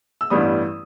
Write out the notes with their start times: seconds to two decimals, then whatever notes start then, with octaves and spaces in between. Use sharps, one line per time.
0.21 E6
0.30 A1 G2 E3 G3 B3 D#6